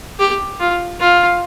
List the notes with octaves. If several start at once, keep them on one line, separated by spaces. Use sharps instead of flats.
G4
F4
F4